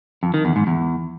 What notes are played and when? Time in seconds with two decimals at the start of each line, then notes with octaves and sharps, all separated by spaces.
0.23 F2
0.34 D#3
0.45 E2
0.56 G#2
0.67 E2